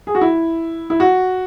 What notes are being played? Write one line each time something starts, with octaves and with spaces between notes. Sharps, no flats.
G#4
F#4
E4
E4
F#4